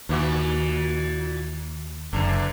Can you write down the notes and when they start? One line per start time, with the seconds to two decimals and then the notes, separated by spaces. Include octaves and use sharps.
0.09 D#2 A#2 E3 F#4
2.13 F#1 E2 D3